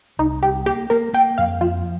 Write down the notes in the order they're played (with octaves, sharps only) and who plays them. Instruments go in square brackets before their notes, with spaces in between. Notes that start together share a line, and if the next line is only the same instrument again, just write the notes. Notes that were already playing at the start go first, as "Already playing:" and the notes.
[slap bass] C2 [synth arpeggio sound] D#4
[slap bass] C2 [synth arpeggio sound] G4
[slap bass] A#3 [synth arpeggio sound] G4
[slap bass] A#3 [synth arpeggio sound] A#4
[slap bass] A#3 [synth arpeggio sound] G5
[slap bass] F2 [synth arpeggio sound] F5
[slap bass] F3 [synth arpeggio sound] F4